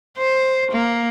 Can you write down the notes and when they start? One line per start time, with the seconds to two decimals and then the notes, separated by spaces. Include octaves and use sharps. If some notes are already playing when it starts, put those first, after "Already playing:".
0.18 C5
0.71 A#3